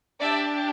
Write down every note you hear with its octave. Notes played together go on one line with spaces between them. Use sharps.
D4 G4 D5 E5